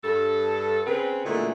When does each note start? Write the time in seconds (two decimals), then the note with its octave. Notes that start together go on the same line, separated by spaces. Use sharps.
0.04 G2 A4
0.87 C#3 C4 B4
1.25 F#2 A#2 D3 E3 G#3 A3